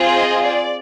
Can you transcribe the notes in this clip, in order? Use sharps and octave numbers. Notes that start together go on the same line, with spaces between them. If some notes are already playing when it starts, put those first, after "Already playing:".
Already playing: C4 F4 G#4
D#5
D5